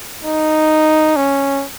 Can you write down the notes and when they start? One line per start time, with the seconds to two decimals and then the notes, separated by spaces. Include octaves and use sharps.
0.25 D#4
1.16 C#4